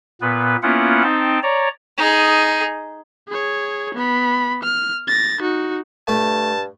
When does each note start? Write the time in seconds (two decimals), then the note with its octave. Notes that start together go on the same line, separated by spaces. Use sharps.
0.21 A#2 B3 B4
0.63 A#3 B3 C#4 E4 F4 F#5
1.03 C4 D#4 G5 A5
1.43 C#5 D5 A#5
1.98 D#4 G#4
3.28 G#4 C#5
3.94 B3 B5
4.63 F6
5.07 A6 A#6
5.41 D#4 F#4
6.08 G2 A3 A5